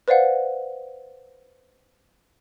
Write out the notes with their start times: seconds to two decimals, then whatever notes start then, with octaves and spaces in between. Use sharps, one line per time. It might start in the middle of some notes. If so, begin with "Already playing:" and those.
0.08 B4 C5 D5 F5 F#5